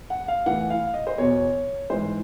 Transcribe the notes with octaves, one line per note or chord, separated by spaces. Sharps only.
F#5
F5
A2 E3 F#5
F5
D#5
C5
E2 B2 C#5
G#2 E3 C5